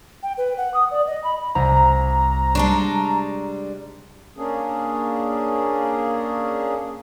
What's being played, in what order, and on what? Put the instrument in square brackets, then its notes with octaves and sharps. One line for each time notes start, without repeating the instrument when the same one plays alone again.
[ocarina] G5
B4
F#5
D#6
D5
D#5
B5
[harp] C2 [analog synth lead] A#5
[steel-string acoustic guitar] G3 G#3 D4 [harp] A5 C#6
[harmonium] A#3 C#4 D4 G#4